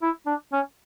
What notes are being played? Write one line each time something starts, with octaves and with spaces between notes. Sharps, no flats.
E4
D4
C#4